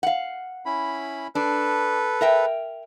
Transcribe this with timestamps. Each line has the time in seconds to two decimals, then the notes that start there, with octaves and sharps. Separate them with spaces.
0.03 F5 F#5
0.66 C#4 E4 B5
1.35 D4 A4 B4
2.21 A#4 E5 G5